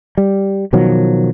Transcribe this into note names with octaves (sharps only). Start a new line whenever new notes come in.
G3
B2 D#3 F3 F#3